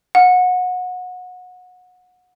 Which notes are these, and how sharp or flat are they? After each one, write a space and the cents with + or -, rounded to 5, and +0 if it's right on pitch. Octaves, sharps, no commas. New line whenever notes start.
F#5 -25